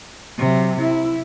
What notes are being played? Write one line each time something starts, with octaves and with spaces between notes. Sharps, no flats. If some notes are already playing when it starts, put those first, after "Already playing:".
C3 F#3
E4